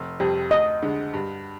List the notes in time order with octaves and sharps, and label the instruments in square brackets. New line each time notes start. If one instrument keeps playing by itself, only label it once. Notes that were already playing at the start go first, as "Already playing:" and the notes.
Already playing: [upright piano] F1
F2 C3 G3 C4
[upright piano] D2 [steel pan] D#5
[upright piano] D3 G#3
G2